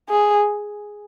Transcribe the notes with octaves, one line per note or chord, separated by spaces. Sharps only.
G#4